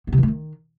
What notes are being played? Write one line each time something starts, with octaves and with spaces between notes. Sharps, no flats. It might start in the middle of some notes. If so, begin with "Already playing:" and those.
B3
C3
E3
A3
D#3